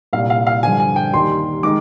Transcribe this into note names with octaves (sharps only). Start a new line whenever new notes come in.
C2 A#2 G3 F5
F5
F5
G2 D3 F3 G#5
G#5
G5
D#2 D#3 G3 C6
D#3 G#3 D6